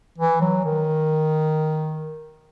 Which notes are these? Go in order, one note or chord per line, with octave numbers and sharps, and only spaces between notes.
E3
F#3
D#3